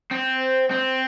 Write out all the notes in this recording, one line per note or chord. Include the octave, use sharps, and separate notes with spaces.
C4
C4